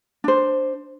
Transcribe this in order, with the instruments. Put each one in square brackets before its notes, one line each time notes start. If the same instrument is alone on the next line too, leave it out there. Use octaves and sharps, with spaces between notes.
[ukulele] D4 C5